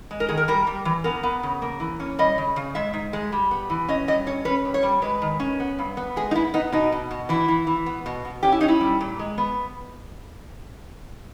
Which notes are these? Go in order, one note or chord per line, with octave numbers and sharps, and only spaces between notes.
G#3
A#4
D#3 G#4
A#4
G3 A#4
G3
E3
B3 A#4
B3
C#3
A#3
E3
C#4
G3 D#5
C#3
C#3
G#3 E5
G#2
G#3
G3
B3
E3
C#4 D#5
G2 D#5
C#4 C#5
C#4 B4
G2
C#5
G3
G#3 B4
D#3
C#4
B3
G2
B3
G#3 G#4
D#4
B3 E4
B3 D#4
B2 D#4
B2
B2
E3 E4
E3
E3
B3
B2
B2
C#4 G4
E4
C#4 D#4
E4
G3
A#2
G#3
B3